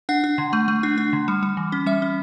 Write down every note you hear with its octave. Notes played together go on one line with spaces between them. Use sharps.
D4 F#5
D4
D3
A3
A3
D4
D4
D3
G3
G3
E3
C#4
G3 E5
C#4